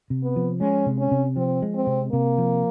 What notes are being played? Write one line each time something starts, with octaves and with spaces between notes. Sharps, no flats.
C3
B3
F3
G#3 C#4
C3
C#4
C3
F3 C4
G#3
C4
C3
C3 A#3
F3